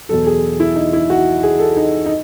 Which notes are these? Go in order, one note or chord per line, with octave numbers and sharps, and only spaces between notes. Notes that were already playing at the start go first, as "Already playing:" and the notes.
E2 B2 F#3 A4
G#4
E4
D#4
E4
F#4
G#4
A4
D#4
D#4